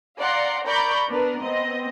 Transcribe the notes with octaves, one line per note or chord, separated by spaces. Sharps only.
D5 F5 F#5 A#5 C6
A#4 D5 A#5 B5 C#6 G6
B3 D4 A#4 B4
B3 C4 D#5